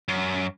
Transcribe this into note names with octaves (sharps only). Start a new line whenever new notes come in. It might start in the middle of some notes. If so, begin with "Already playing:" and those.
F#2